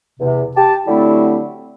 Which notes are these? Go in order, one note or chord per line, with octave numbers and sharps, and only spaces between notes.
E2 C3
G4 A5
D3 F#3 G3 A3 C4 E4